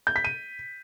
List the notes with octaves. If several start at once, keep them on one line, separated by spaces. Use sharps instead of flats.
G6
B6
D#7